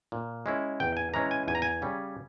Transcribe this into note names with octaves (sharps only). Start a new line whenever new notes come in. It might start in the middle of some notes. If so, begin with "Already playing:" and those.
A#2
G#3 C#4 E4
E2 G5
G#5
E3 G#3 C#4 E4 A#5
G#5
E2 G#5
A#5
G#5
C#3 G3 C#4